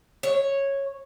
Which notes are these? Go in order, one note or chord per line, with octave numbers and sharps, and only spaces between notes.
C#5